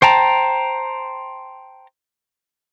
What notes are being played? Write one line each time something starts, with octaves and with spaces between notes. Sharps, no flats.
C5 G5 A5 A#5